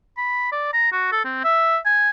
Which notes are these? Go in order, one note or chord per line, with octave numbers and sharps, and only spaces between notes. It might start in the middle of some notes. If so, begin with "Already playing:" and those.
B5
D5
A#5
F#4
A4
C4
E5
G#5